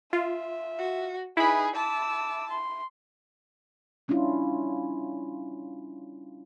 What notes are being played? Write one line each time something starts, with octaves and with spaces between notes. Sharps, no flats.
F4 E5
F#4
D#4 E4 G#4 B4 B5
A5 D6 E6
C6
G3 C#4 D4 E4 F4